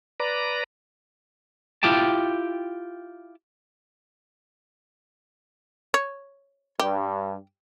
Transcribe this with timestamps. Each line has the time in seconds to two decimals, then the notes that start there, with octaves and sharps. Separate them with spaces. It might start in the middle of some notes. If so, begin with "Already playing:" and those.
0.20 B4 D5 A#5
1.83 E4 F4 G4 G5 A5
5.94 C#5
6.79 G2 G4